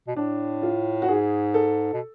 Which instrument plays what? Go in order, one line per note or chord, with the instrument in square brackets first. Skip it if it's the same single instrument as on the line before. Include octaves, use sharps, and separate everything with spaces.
[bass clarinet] B2
[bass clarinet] A2 [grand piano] D4
[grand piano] F4
F#4
[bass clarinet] G#2 [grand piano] G#4
[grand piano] A4
[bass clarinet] B2